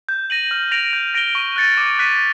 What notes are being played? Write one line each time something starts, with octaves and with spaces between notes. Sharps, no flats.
G6
A#6 D#7 F#7
F6
A#6 D7 F7
G6
A#6 D7 G7
C#6
F#6 A6 C#7
D6
F#6 B6 D#7